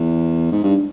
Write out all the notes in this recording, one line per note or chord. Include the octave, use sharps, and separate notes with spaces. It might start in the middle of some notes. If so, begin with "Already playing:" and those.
Already playing: E2
G#2
G2